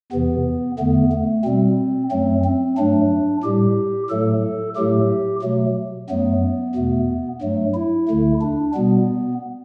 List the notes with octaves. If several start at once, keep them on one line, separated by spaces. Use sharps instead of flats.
E2 C3 E3 B3
E2 D3 A3 B3
A3
B2 G3 C4
F#2 F#3 A3 C4
C4
G2 F#3 A3 D4
A2 G3 G4
A2 F#3 A3 A4
A2 F#3 A3 G4
B2 F#3 A3
F#2 F#3 A3 B3
E2 B2 A3
G2 F#3 A3
E4
D2 D3 A3
D4
B2 G3 B3